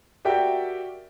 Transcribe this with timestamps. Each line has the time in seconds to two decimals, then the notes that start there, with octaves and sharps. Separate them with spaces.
0.25 F#4 G4 A#4 D5 E5 G5